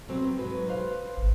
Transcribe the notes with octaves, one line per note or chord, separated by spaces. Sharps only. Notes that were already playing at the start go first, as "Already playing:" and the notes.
F#3 B3 C4
G#2 F#3 B4
B4 C5 F5
G#1